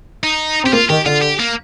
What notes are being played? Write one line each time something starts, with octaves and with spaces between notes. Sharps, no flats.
D#4
C4 G4
A#3 F4
D#3 G4
D3 F4
G4
A#3